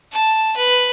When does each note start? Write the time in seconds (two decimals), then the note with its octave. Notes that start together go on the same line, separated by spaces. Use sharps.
0.12 A5
0.56 B4